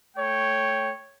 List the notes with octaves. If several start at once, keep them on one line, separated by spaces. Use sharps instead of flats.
A3 C#5 G5